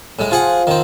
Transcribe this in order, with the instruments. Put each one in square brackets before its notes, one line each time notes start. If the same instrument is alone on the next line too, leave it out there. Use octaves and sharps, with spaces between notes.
[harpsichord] A2 G#3
[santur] F3 [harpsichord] F4 G#4 F#5
[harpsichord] D#3 C4